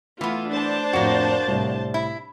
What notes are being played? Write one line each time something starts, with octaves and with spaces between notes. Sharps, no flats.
E3 A3 B3 F4
D4 C5 A5
F2 A2 A#3 F#4
C2 A2
E4